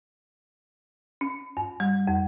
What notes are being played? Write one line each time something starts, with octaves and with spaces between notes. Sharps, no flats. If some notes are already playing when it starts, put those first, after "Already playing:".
C#4
G2
G3
F2